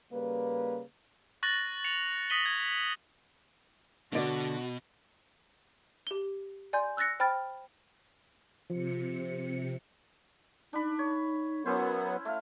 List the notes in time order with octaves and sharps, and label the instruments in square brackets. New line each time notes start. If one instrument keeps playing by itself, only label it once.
[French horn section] C#3 G3 A#3 B4
[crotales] C#6 F#6 A6 A#6 F#7
A6 C#7 F7
D#6 A#6 B6 D#7 F#7 G7
G#6
[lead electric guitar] B2 [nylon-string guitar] D3 D5 [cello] F#4
[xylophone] G4 G7
D5 G#5 C6 G6
E6 F#6 A6 A#6 C#7
C5 G5 B5 F6 A6
[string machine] C3 C#7 [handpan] F3
[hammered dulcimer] D4 B5 [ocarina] D#4
[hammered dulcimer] C#5
[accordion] F#3 B3 [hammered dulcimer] C#4 E4 C5 [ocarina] A#4
[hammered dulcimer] A3 F5 [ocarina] E5